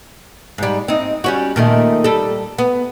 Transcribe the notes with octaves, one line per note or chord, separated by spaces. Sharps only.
G#2 G3
C4 D#4
G3 C#4 F#4
A#2 D#3 A3
G3 A4
B3